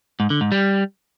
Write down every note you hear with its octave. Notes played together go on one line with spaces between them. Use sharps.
G#2
D3
G#2
G3